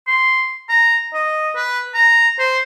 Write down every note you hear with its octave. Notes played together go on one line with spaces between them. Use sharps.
C6
A#5
D#5
B4
A#5
C5